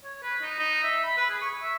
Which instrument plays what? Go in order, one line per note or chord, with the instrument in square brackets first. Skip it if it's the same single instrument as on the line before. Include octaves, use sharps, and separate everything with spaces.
[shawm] C#5
B4
D#4
D#4
E5
B5
B4
G#4
C#6
E5